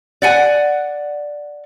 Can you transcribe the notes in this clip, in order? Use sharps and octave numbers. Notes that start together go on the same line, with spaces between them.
D5 F#5 G#5